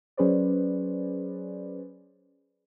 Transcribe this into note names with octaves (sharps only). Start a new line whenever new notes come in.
F#3 C#4 G#4 B4 C5 D5